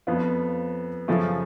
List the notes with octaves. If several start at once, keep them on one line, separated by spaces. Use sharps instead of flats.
F2 F3 B3 F4
F#2 C#3 F3 A3